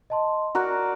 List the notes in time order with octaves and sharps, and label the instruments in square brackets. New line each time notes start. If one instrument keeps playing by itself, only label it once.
[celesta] D#5 A5 C6
[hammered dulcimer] F#4 A#4 D5 [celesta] F#5 A#5 F#6